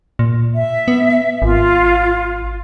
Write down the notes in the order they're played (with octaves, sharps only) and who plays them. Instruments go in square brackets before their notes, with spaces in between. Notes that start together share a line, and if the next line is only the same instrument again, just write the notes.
[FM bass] A#2
[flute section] E5
[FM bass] B3
[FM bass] G#1 [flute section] F4